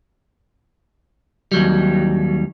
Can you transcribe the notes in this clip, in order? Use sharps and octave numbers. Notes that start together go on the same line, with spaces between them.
D#2 F#3 G3